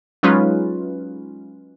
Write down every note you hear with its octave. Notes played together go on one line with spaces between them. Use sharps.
F#3 G#3 C#4 D#4 F4 B4